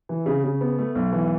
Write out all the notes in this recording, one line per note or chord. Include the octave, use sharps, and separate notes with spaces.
E3
C#3
C#3
B3
A3
B1
E3